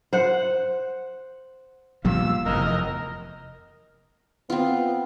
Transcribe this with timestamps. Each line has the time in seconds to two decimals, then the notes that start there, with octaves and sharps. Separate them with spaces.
0.13 C5 F#5
2.05 A#2 F3 G3 F4 E6
2.46 F1 E2 A#4 D#5
4.50 B3 C4 F4